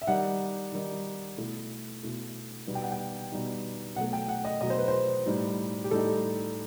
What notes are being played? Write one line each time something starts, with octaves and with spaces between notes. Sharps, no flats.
E5
D#3 G3 D#4 F#5
D#3 G3 D#4
B2 A3 E4
B2 A3 E4
B2 G3 B3 D#4
G5
F#5
G5
B2 G3 B3 D#4
B2 F#3 A3 F#5
G5
F#5
D#5
B2 F#3 A3 D#5
C5
B4
C5
A2 G3 D#4
G4
A2 G3 D#4 A4